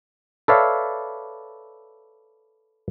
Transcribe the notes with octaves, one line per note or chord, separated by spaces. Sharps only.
A4 B4 C#5 D5 E5 F5